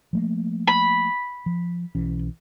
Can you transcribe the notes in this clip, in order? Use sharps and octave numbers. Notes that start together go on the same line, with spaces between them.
F3 A3 A#3
B5
F3
B1 E3 C#4